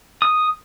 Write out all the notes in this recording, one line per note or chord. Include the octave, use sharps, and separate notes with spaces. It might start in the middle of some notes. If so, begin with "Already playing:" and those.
D#6